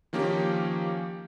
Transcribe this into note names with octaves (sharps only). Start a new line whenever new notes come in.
D#3 F3 A#3 C#4 G4